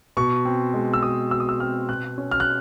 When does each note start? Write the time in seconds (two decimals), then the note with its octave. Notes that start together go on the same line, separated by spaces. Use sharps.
0.17 B2 C#6
0.45 C4
0.74 G#3
0.94 E6
1.03 B2 D#6
1.31 B2 E6
1.40 D#6
1.49 E6
1.60 C4 F6
1.89 B2 F#6
2.18 C#4
2.31 F6
2.40 F#6